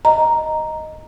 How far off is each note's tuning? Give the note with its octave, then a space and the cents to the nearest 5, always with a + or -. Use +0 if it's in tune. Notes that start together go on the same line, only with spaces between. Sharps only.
D#5 +0 A#5 +0